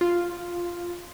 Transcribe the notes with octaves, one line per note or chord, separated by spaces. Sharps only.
F4